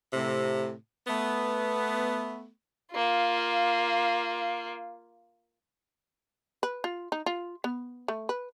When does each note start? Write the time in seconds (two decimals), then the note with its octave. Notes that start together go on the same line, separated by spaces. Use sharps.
0.13 A2 C3
1.07 A3 B3
2.95 A#3 F4
6.63 B4
6.84 F4
7.12 D#4
7.26 F4
7.64 B3
8.08 A3
8.29 B4